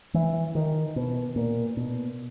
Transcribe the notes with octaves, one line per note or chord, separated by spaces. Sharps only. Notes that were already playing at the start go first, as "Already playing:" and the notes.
E3
D#3
B2
A#2
B2